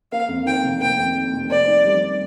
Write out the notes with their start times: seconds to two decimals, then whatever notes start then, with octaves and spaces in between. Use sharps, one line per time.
0.12 A#3 F5
0.28 F2
0.46 D#3 G5
0.64 F1
0.80 A#3 G5
0.98 F2
1.16 D#3
1.34 F1
1.50 A#3 D5
1.67 D#3
1.85 G3